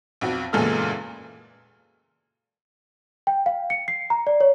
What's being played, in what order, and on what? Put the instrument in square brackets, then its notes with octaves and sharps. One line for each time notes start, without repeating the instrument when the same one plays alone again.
[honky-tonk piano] B1 F2 F#4
F#1 E2 A#2 G#3 A4 F6
[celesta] G5
F5
C#7
C7
A#5
D5
C#5